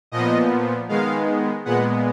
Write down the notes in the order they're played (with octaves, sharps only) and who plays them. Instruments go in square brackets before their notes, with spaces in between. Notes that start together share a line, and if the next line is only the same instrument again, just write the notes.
[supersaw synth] A#2 F3 B3 D#5
D#3 G#3 B3 F5
A#2 G#3 B3 F#5